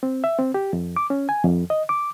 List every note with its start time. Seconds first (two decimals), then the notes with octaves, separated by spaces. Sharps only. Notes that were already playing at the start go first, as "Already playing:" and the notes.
0.03 C4
0.24 E5
0.39 C4
0.54 G4
0.73 F2
0.97 D6
1.10 C#4
1.29 G#5
1.44 F2
1.70 D#5
1.89 D6